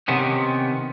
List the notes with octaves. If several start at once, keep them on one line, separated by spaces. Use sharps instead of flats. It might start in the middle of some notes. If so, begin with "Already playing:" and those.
C3 D#3 B3 C#4